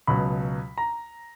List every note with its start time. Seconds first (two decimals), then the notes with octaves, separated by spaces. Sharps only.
0.07 C#2 B2 F#3 B5
0.78 A#5